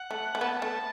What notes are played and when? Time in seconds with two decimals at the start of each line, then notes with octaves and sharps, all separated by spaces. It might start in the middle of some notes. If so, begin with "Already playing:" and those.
Already playing: F#5
0.11 A3
0.35 A3
0.41 B3 A5
0.50 F#5
0.57 A3 A5